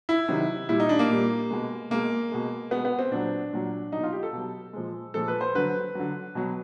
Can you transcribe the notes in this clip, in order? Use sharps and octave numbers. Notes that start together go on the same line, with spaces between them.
E4
C3 D#3 F#3
A#2 G3 E4
D#4
D4
A#3
A#2 G3
B2 G#3
B2 G#3 A#3
B2 G#3
B2 G#3 B3
B3
C4
A#2 F#3 D4
A#2 F#3
B2 F#3 D#4
F4
G4
A4
B2 F#3
A#2 F3 G#3
A#2 F3 G#3 A4
B4
C5
D3 F#3 B4
D3 F#3
B2 F#3